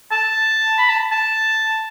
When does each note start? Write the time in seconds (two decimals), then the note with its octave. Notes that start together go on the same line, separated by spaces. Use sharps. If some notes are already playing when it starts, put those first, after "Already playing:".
0.11 A5
0.78 B5
0.89 A5
1.12 A5